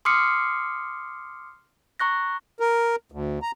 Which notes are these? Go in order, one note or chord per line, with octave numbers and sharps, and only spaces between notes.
C6 D6 D#6 F6 C7 C#7
A#5 C#6 F#6 A#6
A#4
D2
A#5